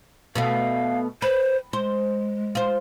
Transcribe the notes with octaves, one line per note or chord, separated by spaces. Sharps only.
B2 A3 B3 F5
B4 C5
G#3 C5
F4 C5